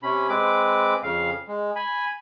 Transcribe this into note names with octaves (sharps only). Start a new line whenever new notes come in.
C3 C#4 B5
G#3 C4 B4 D6
F2 C#3 F5
G#3
G#5 B5